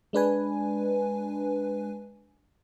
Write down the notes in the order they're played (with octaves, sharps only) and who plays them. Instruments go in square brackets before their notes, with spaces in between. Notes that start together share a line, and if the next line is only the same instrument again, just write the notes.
[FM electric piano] G#3 D4 B4 G#5